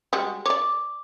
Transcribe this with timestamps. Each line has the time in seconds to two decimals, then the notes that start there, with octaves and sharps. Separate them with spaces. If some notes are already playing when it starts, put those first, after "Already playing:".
0.13 G3 G#3 F#4
0.46 C#5 D5 D6